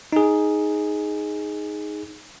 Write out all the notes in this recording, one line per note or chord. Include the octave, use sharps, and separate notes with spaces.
D#4 G#4